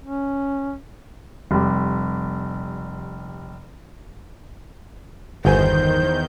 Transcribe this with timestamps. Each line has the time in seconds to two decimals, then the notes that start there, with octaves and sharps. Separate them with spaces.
0.02 C#4
1.51 F1 G3
5.45 G1 E2 D#3 C5 G#5 G6